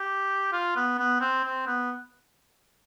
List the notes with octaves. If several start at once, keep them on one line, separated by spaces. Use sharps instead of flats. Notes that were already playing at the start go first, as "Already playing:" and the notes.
Already playing: G4
F4
B3
B3
C4
C4
B3